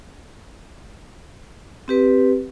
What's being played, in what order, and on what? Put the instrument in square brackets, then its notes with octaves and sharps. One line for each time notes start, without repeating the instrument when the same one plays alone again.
[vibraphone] C4 G4 B4